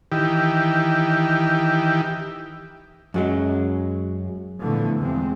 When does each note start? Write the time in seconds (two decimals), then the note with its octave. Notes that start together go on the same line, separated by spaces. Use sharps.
0.12 D#3 E3 G4
3.14 F#2 F#3 G#3
4.62 A#2 D3 E3 F3 A3 B3
5.00 E2 C3 F3 G#3 C4